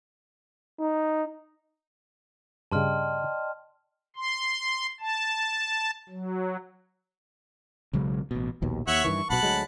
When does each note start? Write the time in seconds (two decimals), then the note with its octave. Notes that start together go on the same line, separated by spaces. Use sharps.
0.80 D#4
2.72 G2 C#3 D5 D#5 G5 A5 C6 F6
4.16 C6
5.00 A5
6.09 F#3
7.93 B1 C#3 F#3 G#3
8.31 A1 B2
8.62 A#1 D#2 B2
8.88 D#2 C#5 E5 F#5
9.05 G2 D#3 E3 C#6
9.30 B1 B2 F#5 A5 B5
9.43 D2 F#3 G#3